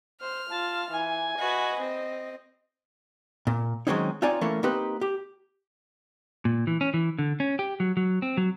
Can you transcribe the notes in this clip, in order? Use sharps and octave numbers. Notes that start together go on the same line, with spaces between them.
C5 F6
F4 A5
E3 G#5
F#4 B4 D#5
C4
A#2
D#3 F#3 G#3 C4 C#4 D#4
C4 D#4 F4 C#5 D5 G#5
E3 A3 A#3 C#4
A#3 C4 D#4 G4 B4
G4
A#2
E3
C#4
E3
D3
C#4
G4
F#3
F#3
C4
F#3